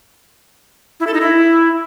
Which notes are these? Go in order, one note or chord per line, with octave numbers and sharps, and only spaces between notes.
E4
A4
D#4
E4